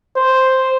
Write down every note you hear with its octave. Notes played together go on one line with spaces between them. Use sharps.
C5